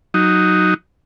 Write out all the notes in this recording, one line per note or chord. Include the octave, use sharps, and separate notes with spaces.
F#3 D#4